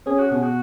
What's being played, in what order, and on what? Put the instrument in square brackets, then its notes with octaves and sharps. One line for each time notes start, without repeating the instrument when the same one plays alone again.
[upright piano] C#4 [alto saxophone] G#4
[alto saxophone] F#4
[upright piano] B2 [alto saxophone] G#4
[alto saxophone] F#4